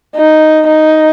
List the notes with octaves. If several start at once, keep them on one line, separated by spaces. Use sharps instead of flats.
D#4
D#4